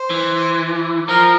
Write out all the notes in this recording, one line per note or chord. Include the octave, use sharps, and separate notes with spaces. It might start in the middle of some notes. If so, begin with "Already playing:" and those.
Already playing: C5
E3
F3 A#4